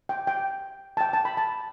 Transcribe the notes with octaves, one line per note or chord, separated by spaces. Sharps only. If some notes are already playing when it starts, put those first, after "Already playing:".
G5
G5
A5
G5
A5
B5
A5